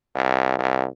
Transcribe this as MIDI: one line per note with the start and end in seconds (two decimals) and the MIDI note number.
0.15 0.58 36
0.58 0.86 36